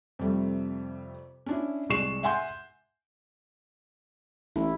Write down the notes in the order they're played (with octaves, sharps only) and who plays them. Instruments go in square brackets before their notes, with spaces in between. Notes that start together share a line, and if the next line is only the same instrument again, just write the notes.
[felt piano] F2 C3 G3 A3
C#4 D4 E4
C2 G#3 D5 C#6 C7 E7
E5 F#5 G#5 C6 G6
[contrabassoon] A1 [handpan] E4